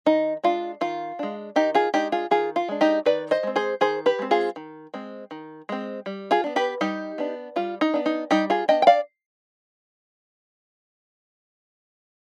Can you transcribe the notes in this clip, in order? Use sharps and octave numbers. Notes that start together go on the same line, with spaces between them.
D#3 D#4
G#3 D4 F4
D#3 F4
G#3 D4
D#3 D#4 G4
F4 G#4
G#3 D4 D#4 G4
F4 G#4
D#3 F4 G#4
F4
G#3 D4
D#4 G4
D#3 B4 D5
C5 D#5
G#3 C4
G#4 C5
D#3 G#4 C5
G4 B4
G#3 C4
F4 G#4
D#3
G#3 C4
D#3
G#3 C4
G3
F4 G#4
B3 D4
G4 B4
G3 D#4 G4
B3 D4
G3 F4
D#4
B3 D4
D#4
G3 D#4 G4
F4 G#4
B3 D4 D#5 G5
G5
D5 F5